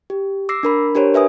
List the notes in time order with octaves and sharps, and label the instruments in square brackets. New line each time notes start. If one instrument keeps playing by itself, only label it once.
[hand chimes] G4
D6 E6 A#6 C7
D4 A#4 B5
D4 G4 A#4 C5 C#5
B4 E5 G#5 D#6